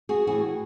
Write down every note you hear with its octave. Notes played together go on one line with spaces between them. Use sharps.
F#4 G#4
A2 E3 F#4 G#4